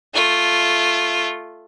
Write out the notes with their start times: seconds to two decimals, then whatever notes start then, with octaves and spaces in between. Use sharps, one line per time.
0.14 A3 F4